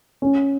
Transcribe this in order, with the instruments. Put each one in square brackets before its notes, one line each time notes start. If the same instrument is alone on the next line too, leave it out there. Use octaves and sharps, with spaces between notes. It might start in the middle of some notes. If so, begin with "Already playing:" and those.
[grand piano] C#4